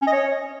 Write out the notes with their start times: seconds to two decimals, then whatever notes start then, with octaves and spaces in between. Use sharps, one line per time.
0.02 C#4
0.07 D#5
0.12 C#5